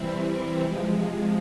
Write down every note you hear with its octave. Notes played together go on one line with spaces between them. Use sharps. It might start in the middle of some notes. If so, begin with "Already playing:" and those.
Already playing: C3 E3 G3 C4 E4
C3 F3 G#3